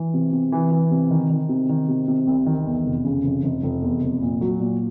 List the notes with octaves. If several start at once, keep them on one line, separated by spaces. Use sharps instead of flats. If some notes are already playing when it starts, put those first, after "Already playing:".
Already playing: E3
C3
C3
E3
E3
C3
D#3
D#3
C3
D#3
C3
C3
C2
D#3
E2
F1
C#3
F1
F1
F1
E2
F1
A#2
F#3
A#2